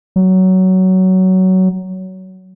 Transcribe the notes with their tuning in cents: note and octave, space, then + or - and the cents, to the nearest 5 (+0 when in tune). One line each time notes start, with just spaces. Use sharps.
F#3 +15